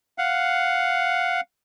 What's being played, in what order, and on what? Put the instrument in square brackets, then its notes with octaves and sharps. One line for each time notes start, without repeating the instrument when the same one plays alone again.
[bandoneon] F5 F#5